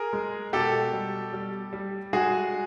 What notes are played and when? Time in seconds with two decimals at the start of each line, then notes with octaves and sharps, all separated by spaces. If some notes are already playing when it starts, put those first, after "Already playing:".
Already playing: G#4 A#4
0.13 G#3
0.53 B2 G4 A4
0.93 G3
1.33 G3
1.73 G3
2.13 G#3 F#4 G#4